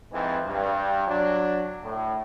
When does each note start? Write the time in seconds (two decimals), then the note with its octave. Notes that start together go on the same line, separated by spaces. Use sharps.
0.12 F2 G#2 E3
0.44 G2
1.07 F#3 D4
1.82 A2